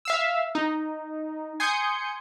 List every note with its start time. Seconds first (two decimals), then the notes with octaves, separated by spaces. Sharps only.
0.05 E5 F5 E6
0.55 D#4
1.60 G#5 C6 D#6 G6 C#7